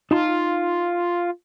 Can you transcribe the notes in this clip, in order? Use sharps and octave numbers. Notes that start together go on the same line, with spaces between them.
D#4 F4 A5 C6